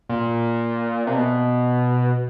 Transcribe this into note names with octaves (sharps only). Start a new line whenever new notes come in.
A#2
C3
B2